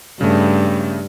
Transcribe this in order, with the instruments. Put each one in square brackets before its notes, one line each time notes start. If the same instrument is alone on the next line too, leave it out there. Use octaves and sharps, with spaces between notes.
[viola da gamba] G2 [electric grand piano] C#3 A3